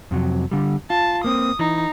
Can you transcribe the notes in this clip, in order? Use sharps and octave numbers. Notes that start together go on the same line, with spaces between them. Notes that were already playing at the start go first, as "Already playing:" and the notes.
F2 C3 F#3
D3 G3
F4 A5
A#3 C4 D#6
E3 D#4